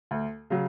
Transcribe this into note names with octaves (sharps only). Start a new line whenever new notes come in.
D2
C#3 F#3